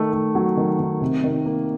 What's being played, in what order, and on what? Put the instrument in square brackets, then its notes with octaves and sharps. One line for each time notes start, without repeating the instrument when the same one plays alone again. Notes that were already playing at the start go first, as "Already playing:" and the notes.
Already playing: [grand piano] D#3 A3
A3
F#3
D#3
D#3
C3
D#3
A#3